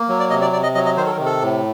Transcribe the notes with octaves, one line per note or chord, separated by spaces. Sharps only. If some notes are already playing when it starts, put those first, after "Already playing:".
Already playing: A#3
F#3
D5
C3 D#5
D5
C3 D5
D#5
F#3 D#5
D#5
D#3 C5
A4
A#4
C3
A4
A2